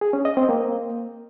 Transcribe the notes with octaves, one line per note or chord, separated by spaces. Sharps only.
G#4
C#4
D#5
C4
A#3